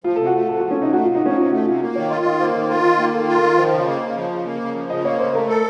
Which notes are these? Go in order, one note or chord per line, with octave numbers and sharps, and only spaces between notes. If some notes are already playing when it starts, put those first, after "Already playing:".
F3 F4
C3 A4
F#4
A3
C3 A4
F3 F#4
C#4
C3 D#4
A3 F#4
C3 F4
D#4
F3 C#4
C3 F4
A3 F#4
C3 F4
A#3 F4
D#3 C#5
F4 D#5
D#3 D#5
A#3 C5
D#3 C5
F4 A#4
D#3
A#3
D#3 A4
F4
A#4
D#3
F3 C5
C#3
D#5
A#3
C#3
F3
C#3
A#3
C#3
F3
C#3 D#5
A#3 C#5
C#3 C5
A3 A#4
A4